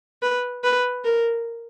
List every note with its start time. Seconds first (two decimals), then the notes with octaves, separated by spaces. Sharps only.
0.22 B4
0.64 B4
1.04 A#4